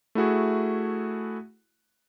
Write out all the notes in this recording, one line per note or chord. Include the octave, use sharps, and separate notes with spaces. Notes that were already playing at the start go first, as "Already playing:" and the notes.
A3 E4 F#4 G#4